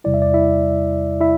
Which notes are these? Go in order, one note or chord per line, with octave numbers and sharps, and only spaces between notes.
E2 C3 G3 E4 D5
E5
D5
E4 E5
E4 E5